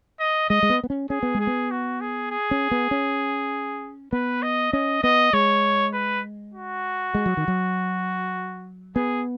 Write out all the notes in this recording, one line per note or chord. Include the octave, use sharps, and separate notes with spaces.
D#5
G#3 D#5
G#3
B3
B3
C#4
C#4 G#4
B3
G#3
G#4
B3
F#4
G#4
G#4
C#4
B3
C#4
B3 B4
D#5
C#4 D#5
B3 D#5
G#3 C#5
B4
F#4
G#3
F#3
D#3
F#3
B3 G#4